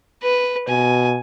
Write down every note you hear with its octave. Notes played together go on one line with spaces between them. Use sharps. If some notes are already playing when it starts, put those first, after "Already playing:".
B4
B2 G#5